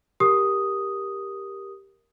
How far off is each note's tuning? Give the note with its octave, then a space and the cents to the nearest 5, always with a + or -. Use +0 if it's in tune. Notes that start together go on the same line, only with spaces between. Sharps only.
G4 +0 A#4 +0 D#6 +0